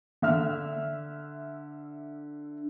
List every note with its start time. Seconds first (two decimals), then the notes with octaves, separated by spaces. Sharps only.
0.22 D3 E5 F6